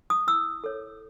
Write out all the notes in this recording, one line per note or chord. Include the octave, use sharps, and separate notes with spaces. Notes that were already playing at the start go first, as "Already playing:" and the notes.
D#6
E4 E6
A4 C#5